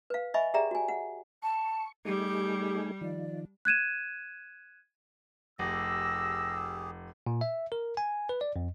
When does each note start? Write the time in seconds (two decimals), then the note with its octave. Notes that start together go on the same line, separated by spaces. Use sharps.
0.10 B4 F5
0.34 D#5 E5 G#5 B5 C#6
0.54 G4 G#4 D5 E5 G5 A#5
0.71 F#4 G#5
0.88 F#5
1.42 A5 C#6
2.05 G3 A3 D#4 G4 G#4
3.01 D#3 F3 D5
3.65 F#6 G#6 D#7 E7
5.59 F1 G4 G#4 E6 A#6
7.27 A#2
7.41 E5
7.72 A#4
7.97 G#5
8.29 B4
8.41 D5
8.56 F2